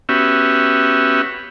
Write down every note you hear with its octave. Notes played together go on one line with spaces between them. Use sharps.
B3 C#4 F#4 G4 E5